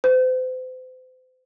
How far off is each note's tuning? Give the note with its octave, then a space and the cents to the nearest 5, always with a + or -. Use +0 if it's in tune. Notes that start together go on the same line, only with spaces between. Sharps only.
C5 -40